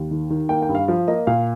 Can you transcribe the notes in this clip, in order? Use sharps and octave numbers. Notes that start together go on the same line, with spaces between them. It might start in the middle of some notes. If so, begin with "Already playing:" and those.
Already playing: D#2
D#3
D#3
A#3 G5
G5
G2
F5
F3 F5
A#3 D#5
A#2 F5